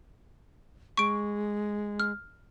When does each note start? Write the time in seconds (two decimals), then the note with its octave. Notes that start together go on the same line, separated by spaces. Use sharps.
0.97 G#3 C#6 D7
2.00 F6